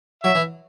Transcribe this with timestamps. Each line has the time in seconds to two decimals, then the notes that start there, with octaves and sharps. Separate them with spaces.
0.24 F#3 E5
0.35 E3